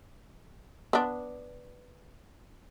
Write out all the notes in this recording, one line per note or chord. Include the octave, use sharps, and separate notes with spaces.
B3 D4